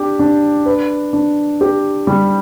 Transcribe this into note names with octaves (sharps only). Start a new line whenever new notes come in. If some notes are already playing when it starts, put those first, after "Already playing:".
Already playing: D4 G4
D4
B4
D4
G4
G3